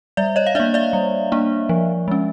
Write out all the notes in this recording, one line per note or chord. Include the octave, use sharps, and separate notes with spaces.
G3 D5 E5
C#5 D#5
F5
A#3 D4 D5 E5
D5 E5
G3
A#3 D4
F3
G#3 C#4